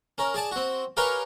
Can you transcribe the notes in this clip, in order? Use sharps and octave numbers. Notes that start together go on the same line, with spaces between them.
C#4 A#4
G#4 D5 A5
C4 F#4
G4 A#4 B4 C#5 F5 G#5